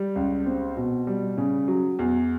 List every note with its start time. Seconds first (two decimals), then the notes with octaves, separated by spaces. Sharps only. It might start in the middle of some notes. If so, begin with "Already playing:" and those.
Already playing: G3
0.16 C#2
0.46 C4
0.76 B2
1.07 G3
1.38 C#3
1.68 F#3
1.99 E2